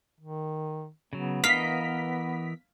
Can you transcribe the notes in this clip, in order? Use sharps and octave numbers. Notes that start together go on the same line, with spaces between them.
D#3
C#3 F#3 B3
E3 A#4 D#5 F5 B6